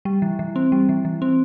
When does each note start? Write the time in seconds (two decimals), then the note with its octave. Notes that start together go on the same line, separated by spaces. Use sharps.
0.05 G3
0.22 E3
0.39 E3
0.56 C4
0.72 G3
0.89 E3
1.05 E3
1.22 C4